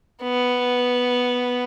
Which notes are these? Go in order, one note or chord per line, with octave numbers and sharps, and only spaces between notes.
B3